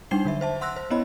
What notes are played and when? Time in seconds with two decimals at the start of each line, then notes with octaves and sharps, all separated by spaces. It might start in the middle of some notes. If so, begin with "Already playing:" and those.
0.11 G3 D4 D#4 G5 C7 G7
0.25 D3 F#3 E5
0.41 C5 E5 A5
0.61 F#5 C6 E6 F#6 A#6
0.76 C5
0.90 B3 C#4 E4 C#5 D#5 B5